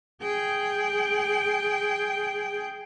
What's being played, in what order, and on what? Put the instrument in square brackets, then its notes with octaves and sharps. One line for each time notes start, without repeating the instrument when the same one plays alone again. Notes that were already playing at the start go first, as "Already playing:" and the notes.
[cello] G#4 G5